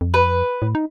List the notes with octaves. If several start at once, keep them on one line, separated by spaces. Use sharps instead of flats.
F2
B4
A2
D#4